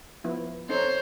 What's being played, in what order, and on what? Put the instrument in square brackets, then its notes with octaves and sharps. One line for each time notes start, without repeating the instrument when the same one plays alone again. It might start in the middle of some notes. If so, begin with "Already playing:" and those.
[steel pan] F3 B3 E4
[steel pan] C4 D#4 A4 [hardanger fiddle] C5 C#5